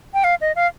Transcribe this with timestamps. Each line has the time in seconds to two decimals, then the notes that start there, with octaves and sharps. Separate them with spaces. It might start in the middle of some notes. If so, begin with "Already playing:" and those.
0.14 G5
0.24 F5
0.41 D#5
0.56 F5